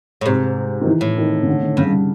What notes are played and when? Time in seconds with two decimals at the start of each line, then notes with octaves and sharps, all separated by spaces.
0.21 A2
0.26 G#2 C3
0.81 D#3
0.87 E3
1.01 A2
1.17 D#3
1.43 C#3
1.47 D3
1.62 D3
1.77 G2 C#3
1.88 D3